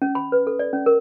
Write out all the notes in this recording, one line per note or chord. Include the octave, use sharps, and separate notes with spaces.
C#4
B5
B4
A4
D5
C#4
A#4